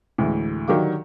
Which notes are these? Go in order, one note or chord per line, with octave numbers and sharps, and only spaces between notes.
D2 A2 E3 G#3
D3 D#3 F#3 G4 F5 D6